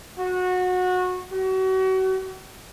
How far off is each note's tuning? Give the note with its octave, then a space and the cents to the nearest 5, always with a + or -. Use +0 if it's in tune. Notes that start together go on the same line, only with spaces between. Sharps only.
F#4 -20
F#4 +35